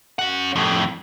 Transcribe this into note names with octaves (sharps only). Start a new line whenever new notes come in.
C#4 F#5
F2 A2